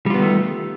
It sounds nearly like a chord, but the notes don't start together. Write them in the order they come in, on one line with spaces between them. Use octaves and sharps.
G3 F4 B3 D#3 A3